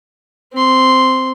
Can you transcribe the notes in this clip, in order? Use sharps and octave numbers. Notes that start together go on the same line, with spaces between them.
C4 C6